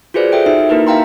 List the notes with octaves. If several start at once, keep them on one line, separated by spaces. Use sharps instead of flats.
F4 F#4 G#4 B4 C5 D5
A4 E5 G5 D7
D#4 F#4 A4 E5
A#3 D#4 E4 A#4 B4
E5 F5 G5 A#5 C6